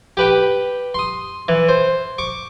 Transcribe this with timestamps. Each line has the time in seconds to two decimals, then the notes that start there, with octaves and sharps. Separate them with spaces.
0.17 G4 B4 G5
0.94 C6 D#6
1.48 E3
1.69 C5
2.18 C#6 D6